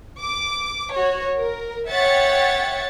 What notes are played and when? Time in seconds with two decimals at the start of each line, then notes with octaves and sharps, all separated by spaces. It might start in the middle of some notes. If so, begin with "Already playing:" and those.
0.19 D6
0.91 F#4 C#5
1.37 A#4
1.90 C#5 E5 F#5 G5 A6 C#7